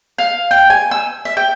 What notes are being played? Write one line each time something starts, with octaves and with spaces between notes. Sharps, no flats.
F5
G5
G#5
E6
E5
G5